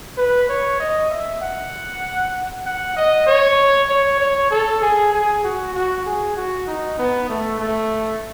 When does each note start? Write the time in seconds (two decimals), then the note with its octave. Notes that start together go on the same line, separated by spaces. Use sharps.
0.17 B4
0.49 C#5
0.80 D#5
1.10 E5
1.42 F#5
2.65 F#5
2.96 D#5
3.27 C#5
3.89 C#5
4.20 C#5
4.51 A4
4.82 G#4
5.13 G#4
5.44 F#4
5.74 F#4
6.05 G#4
6.36 F#4
6.67 D#4
6.98 B3
7.29 A3
7.60 A3